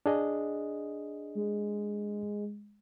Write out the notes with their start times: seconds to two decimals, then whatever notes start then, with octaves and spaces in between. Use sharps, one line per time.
0.06 D4 G#4 D#5
1.35 G#3